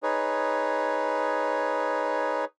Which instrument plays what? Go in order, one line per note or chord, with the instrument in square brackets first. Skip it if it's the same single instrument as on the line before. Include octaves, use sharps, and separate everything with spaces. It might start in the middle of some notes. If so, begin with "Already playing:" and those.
[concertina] D#4 G#4 B4 C#5